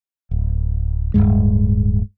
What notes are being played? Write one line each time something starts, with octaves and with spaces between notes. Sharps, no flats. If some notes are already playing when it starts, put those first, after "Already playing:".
D1
D1 C#2 G2 G#3